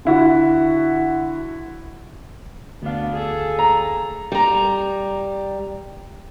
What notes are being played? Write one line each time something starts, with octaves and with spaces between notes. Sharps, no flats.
D3 E4 F#4
D2 B3 D4 F5
G#4 A4
A#5
G3 A#5